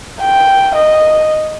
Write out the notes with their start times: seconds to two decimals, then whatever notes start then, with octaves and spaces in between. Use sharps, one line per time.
0.21 G5
0.76 D#5